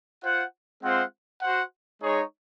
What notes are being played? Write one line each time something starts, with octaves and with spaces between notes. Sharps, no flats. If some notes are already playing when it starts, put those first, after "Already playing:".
F4 C5 F#5
G#3 C4 F4 C5 F#5
F#4 C5 F#5
G#3 D#4 G#4 C#5